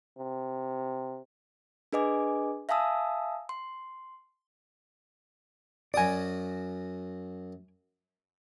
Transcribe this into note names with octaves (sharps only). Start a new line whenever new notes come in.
C3
D4 G#4 B4 D#5 G#5 D6
E5 F5 G#5 A5 D#6 E6
C6
F#2 F#4 D5 G#5 D#6